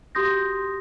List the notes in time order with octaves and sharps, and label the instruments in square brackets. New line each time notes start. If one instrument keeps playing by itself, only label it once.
[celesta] F#4 G4 C6 D#6 G6 A#6